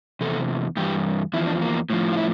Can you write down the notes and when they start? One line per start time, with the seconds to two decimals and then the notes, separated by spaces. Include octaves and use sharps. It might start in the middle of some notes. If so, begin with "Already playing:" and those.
0.21 E2 C3 A4
0.77 G2 E3 G4
1.33 E2 D3 F3 E4
1.47 D4
1.62 A#3
1.90 A2 F3
2.13 F4
2.17 E4